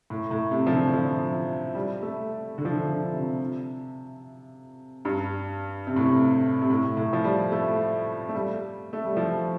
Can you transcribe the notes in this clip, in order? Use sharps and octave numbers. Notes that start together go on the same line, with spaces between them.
A2
A2
C3
F3
D3
F3
G3
A3
D3
F3
D3
D3
C3
G2
C3
A2
C3
C3
A2
A2
F3
G3
A3
A3
G3
A3
G3
F3